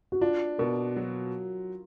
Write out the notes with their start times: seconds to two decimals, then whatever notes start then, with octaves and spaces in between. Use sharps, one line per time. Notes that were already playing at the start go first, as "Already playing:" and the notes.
0.12 F#4
0.21 D4 F4
0.58 B2 A#4
0.97 F#3